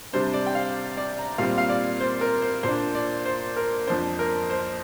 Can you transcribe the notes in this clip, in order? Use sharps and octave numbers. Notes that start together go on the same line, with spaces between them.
C3 G3 D4 C5
D5
G5
F5
D5
A#5
A#2 G3 C4 F5
F5
D5
C5
A#4
C5
A#2 A#3 D4 C5
D5
C5
A#4
F2 F3 D4 C5
A#4
C5